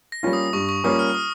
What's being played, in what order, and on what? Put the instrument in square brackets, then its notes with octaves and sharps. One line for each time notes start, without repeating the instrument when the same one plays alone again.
[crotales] A#6
[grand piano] G3 A#3 C#4 F4
[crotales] D#6
[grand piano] G2 [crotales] C#6
[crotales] C#6
[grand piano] G3 A#3 C#4 F4 [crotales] D#6
[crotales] F6
D#6